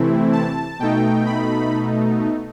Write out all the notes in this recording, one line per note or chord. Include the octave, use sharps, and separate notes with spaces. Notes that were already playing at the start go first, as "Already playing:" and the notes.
Already playing: C3 E3 A3 C4 E4
A5
B2 A3 D#4 G5
B5